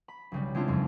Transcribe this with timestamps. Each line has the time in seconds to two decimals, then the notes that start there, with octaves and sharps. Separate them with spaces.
0.08 B5
0.32 B1 C#3 G3
0.55 G#3 C4 D4 E4 F4
0.68 F#1 F2 C#3